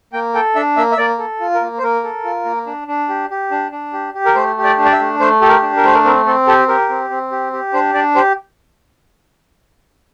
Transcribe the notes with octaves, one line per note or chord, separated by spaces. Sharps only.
A#3 G5
A4 G5
D4 E5
A#3 E5
E5
A#3 D5
A4
F4
A#4
A#3
C5
A#3 A#4
A4
F4
A#3
D4
D4
G4
G4
D4
D4
G4
G4
A#4
A3 C5
G4
D5
D4
D5
E5
A3
A3 C5
G4 A4
A#4
D4
A#4
A3 C5
A#4
C4 A#4
C4 A4
G4 A4
G4 A#4
C4
C4
G4
G4
D4 C5
D4 D5
G4 C5